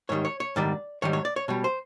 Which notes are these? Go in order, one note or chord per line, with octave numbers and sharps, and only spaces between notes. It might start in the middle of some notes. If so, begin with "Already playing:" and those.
G#2 D#3 G3 C#5
C#5
C#5
G#2 D#3 G3 D5
G#2 D#3 G3 C#5
C#5
D5
C#5
B2 G3 C#5
C5